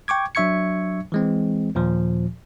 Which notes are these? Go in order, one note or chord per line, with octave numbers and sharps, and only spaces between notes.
G5 C#6 D6 G#6
F#3 D4 E5 C#6 G#6 C#7
E3 G#3 C4
D#2 A#2 F3